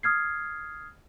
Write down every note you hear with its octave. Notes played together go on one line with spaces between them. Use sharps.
D#6 F6 G#6 C7